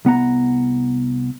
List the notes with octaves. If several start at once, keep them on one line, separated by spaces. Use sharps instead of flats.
C2 B3 F#5 A#5